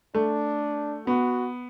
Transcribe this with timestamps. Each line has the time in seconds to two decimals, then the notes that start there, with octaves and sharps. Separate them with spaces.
0.15 A3 D4
1.07 B3 F#4